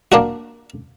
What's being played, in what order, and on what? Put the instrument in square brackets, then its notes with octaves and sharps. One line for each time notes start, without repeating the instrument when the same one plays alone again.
[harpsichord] A#3 D4 F#4